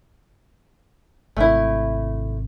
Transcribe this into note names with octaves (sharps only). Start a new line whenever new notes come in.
G#1 C3 A3 E4